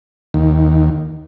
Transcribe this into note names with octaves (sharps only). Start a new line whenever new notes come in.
D#2